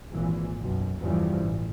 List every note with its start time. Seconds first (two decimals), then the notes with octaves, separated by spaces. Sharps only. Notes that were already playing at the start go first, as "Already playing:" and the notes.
0.10 G#1 A#2 E3
0.59 B1 F#2
0.99 E2 G2 C#3 E3 F3 G3
1.40 A1